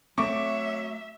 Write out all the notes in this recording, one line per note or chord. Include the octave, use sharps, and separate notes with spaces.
F#3 A3 C4 E5 C#6 D6